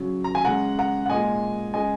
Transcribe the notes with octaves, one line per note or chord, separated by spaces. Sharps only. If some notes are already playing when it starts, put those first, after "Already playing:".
Already playing: C#3 F#3
A#5
G#5
C#3 G#3 F#5 A#5
F#5 A#5
F#5
A#2 G#3 D#5 G#5
C#3 G#3 D#5 G#5